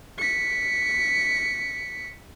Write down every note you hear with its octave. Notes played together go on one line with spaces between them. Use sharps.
B6 C#7